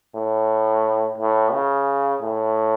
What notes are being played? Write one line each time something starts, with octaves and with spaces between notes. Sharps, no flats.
A2
A2
C#3
A2